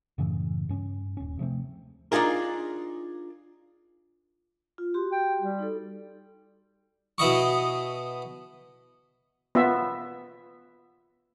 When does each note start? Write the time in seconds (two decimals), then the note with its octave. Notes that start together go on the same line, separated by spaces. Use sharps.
0.18 F#2 A2 C#3 E3
0.69 G2 C#4
1.17 D#1 C#4
1.39 C3 F3 A3 C4
2.12 D4 D#4 F4 G#4 A#4
4.78 F4
4.94 F#4 G4 C6
5.12 G5
5.41 G3
5.59 D#4 A4
7.18 B2 E4 D#5 C#6
9.55 B3 F4 E5